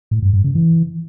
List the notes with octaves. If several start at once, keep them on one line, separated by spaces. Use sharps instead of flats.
A2
G2
G2
C#3
E3